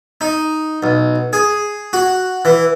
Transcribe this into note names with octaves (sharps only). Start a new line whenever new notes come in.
D#4
B1
G#4
F#4
E3